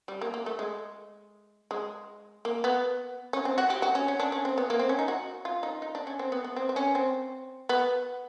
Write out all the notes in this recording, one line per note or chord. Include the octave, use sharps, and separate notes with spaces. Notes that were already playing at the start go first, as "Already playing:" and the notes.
G3
A#3
A#3
A3
G#3
G#3
A#3
B3
C#4
C4
F#4
G4
F#4
C#4
C#4
D4
C#4
C4
B3
A#3
C4
C#4
D#4
F#4
F4
D#4
D#4
D4
C#4
C4
B3
B3
C4
C4
C#4
C4
B3